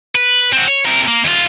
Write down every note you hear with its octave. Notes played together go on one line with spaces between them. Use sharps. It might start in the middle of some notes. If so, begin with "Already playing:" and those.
B4
C4 F#4
C#5
C3 A#4
A#3
D#2 F4